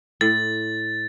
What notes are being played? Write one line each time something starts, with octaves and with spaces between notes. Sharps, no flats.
A2 A6